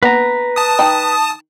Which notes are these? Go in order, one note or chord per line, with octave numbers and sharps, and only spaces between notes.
A#3 B3 D4 B4 A#5
A5 D#6
D#3 D#4 G5